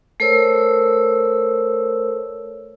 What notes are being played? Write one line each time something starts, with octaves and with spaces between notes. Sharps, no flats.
A3 A4 A#4 C5 C#5 E6